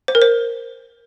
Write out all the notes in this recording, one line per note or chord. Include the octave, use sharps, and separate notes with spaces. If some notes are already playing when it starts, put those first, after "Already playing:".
C5
A#4
C5